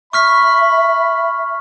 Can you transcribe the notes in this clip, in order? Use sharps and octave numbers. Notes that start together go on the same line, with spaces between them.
E5 B5 C#6 F6 B6